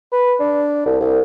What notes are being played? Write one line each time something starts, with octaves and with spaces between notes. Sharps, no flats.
B4
D4
C2
C2